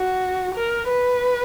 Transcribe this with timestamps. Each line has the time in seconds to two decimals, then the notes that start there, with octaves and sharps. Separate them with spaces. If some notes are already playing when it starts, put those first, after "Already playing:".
Already playing: F#4
0.55 A#4
0.88 B4